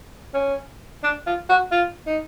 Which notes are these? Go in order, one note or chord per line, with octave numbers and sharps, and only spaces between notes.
C#4
D4
F4
F#4
F4
D#4